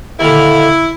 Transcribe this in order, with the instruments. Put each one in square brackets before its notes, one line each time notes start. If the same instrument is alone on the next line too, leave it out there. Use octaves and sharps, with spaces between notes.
[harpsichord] D#2 A#2 D3 [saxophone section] E4